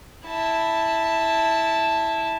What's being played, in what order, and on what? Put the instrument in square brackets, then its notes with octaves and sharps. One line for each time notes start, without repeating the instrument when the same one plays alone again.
[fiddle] E4 A5